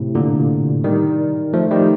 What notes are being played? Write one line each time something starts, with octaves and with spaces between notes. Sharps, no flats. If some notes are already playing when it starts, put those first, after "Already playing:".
Already playing: A2 C3
A#2 D3
D#3 G3
F3 A3
D#3 G3